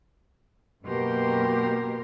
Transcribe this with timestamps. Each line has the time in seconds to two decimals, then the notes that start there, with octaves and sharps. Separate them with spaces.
0.85 F#2 B2 A#3 G4 A#4 C6